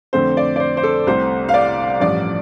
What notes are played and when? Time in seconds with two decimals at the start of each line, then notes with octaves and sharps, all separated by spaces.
0.13 F2 D3 A3 C4 C5
0.37 D5
0.56 D5
0.60 C5
0.77 C5
0.83 A4
1.07 C2 C3 A3 C5
1.49 F5
1.54 D5
2.00 A1 G2 F3 D5